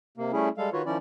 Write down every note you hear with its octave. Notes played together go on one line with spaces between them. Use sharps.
C3 A#3
G3 A3 C#4 E4 G#4
G3 G#3 A4 F5
D#3 F4 F#4 B4 C#5
D#3 F3 C#4 E4 D5